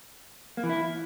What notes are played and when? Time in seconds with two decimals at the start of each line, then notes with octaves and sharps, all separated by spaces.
0.57 A#3
0.63 E3
0.69 E4